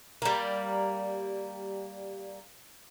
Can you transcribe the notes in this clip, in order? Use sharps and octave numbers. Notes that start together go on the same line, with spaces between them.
G3 A#3